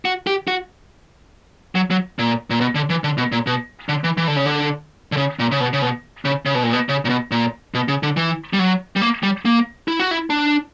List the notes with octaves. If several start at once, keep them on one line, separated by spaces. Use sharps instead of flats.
F#4
G4
F#4
F#3
F#3
A#2
A#2
B2
D3
E3
D3
B2
A#2
B2
D3
E3
E3
D3
C#3
D3
D3
C#3
A#2
C#3
B2
C#3
B2
C#3
C#3
B2
A#2
B2
C#3
A#2
B2
A#2
B2
C#3
D3
E3
G3
F#3
G3
A#3
G3
A#3
E4
F#4
E4
D4